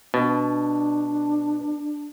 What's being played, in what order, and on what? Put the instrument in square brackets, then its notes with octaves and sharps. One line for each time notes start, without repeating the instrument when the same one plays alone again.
[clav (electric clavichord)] B2 [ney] D4